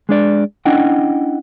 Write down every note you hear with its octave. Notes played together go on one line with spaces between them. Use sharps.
G#3 D4 D5
C#4 D4 E4 D#5 F#5 G5